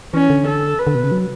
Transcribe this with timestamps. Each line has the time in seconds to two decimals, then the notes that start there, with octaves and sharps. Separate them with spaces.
0.14 E3 C#4
0.30 D3
0.47 A4
0.79 B4
0.87 D3
0.95 B2
1.04 C#3
1.11 F#3